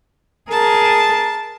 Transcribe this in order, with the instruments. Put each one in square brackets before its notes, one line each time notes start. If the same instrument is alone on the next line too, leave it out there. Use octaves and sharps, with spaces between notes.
[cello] G#4 A#4 [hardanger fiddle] A5